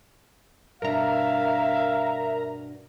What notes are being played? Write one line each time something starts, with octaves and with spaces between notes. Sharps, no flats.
G2 B2 D4 A#4 E5 F5 A#5